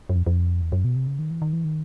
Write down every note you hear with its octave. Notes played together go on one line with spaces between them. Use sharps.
F#2
F2
F2
E2
F#2
B2
C3
C#3
D#3
E3
D#3
E3
D#3